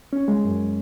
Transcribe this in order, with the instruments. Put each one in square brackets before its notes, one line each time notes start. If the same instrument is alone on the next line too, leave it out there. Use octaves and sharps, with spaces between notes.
[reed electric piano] C#4
G#3
F#2